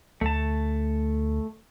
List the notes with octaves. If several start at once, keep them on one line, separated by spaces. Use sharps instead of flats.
D2 A3 A5